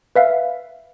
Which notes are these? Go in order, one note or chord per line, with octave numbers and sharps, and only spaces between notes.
B4 E5 F5